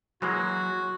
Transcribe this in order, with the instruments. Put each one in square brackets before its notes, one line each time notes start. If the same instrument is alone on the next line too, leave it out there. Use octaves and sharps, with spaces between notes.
[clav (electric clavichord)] E3 G#3 A#3 [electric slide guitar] F#3 [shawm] F#4